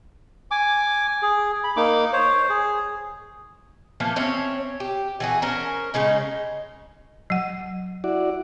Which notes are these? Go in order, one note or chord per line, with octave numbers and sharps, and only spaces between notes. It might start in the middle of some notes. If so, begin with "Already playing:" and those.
G#5 D6
G#4
B5
A#3 D#4 D6
C5 C#5
G#4
E3 F3 A3 A#3
C4 C#4 C#5 E5
G4
E3 F#4 G#4
C#4 A#4 C5
C#3 G#3 C#4 D#4
F#3 F#5
E4 F#4 D5